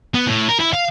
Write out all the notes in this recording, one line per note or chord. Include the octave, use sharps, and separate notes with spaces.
B3
A2
A#4
E4
F5